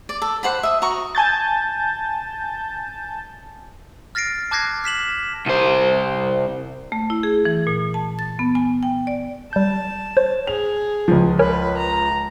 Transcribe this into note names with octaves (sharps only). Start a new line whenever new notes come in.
D5
A4
C5 F#5 G5 B5
E5 D#6
F#4 A#5 C#6 D#6
G#5 A5 G6 A6
F6 A6 A#6 C7 D7
A5 D6 F#6 G#6 A#6 C7
F6 B6 E7 F#7
C2 C5
A3
E4
G#4
E3
A#2
A5
A6
B3
G#5
G5
D5
G3 A5 G6
C5 C#5
G#4 F7
C#2 F3
A#4 B4 C#5 G#5
A#5